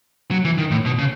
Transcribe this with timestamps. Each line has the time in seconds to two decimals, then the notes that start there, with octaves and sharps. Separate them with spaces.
0.31 F#3
0.45 E3
0.58 D#3
0.71 A2
0.85 B2
0.99 C#3